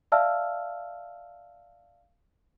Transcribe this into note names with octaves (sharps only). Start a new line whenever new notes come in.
D5 E5 F5 A5 E6 F6